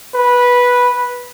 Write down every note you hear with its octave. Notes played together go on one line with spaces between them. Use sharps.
B4